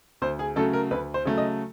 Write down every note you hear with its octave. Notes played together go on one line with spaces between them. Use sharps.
D2 C5
G#4
C#3 F#3 A3 A4
A#4
D2 B4
C5
C#3 F#3 A3
D#5